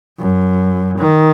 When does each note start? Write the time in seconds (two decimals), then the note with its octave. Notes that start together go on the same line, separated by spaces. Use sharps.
0.20 F#2
0.99 D#3